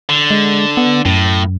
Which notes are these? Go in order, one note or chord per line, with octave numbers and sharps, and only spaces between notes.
D3
G#3
B3
F#2 A2